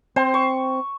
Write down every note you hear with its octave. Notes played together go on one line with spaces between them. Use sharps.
C4 C5
C#6